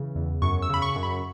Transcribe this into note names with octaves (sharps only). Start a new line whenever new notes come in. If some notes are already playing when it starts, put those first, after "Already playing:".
Already playing: C#3 E3
E2
F#2 C#6
E6
C#3 B5
C#6
F#2
B5